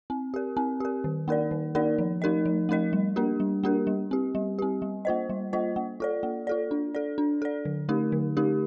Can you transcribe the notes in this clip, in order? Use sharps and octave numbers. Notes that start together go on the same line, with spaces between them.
C4
G4 A#4
C4
G4 A#4
D#3
A#3 D#4 A#4 D5
D#3
A#3 D#4 A#4 D5
F3
A3 D#4 A#4 D#5
F3
A3 D#4 A#4 D#5
G3
A#3 D4 G4 A#4
G3
A#3 D4 G4 A#4
G3
C4 G4
G3
C4 G4
G3
A#3 F4 C5 D#5
G3
A#3 F4 C5 D#5
A#3
F4 A4 D5
A#3
F4 A4 D5
D4
A4 D5
D4
A4 D5
D3
A3 D#4 G4 A#4
D3
A3 D#4 G4 A#4